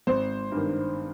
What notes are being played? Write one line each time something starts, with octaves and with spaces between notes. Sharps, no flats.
G#1 C5
G2
D#3